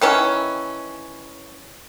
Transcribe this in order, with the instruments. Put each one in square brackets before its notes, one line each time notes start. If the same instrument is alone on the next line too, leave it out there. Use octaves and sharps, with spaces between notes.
[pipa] D#3 E3 C#4